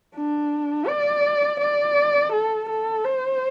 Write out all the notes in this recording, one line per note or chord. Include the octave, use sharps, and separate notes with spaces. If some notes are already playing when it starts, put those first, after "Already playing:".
D4
D5
D5
A4
A4
C5